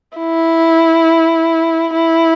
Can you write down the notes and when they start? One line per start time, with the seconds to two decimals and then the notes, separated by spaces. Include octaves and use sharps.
0.18 E4
1.93 E4